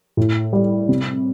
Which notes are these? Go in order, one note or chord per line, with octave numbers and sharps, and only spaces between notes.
A2
G3
C3